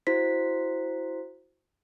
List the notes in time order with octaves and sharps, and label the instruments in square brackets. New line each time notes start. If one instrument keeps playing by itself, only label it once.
[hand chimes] E4 F#4 C5 B6